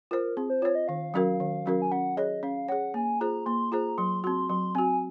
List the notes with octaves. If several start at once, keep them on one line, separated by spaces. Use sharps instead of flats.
F4 A#4 C5
C4 G#4
C5
F4 C5 C#5
D#5
D#3 F5
F#3 C#4 F#4 A#4
D#3
F#3 C#4 F#4 A#4
G#5
C#4 F#5
G#4 C#5 D#5
C#4 F5
G#4 C#5 F#5
A#3 G#5
F4 G#4 C5 A#5
A#3 C6
F4 G#4 C5 A#5
F#3 C6
C4 F#4 C6
F#3 C6
C4 F#4 G#5